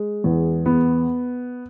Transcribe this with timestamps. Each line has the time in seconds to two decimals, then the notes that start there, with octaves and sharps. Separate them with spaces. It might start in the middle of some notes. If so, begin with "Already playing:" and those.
Already playing: G#3
0.24 E2
0.66 B3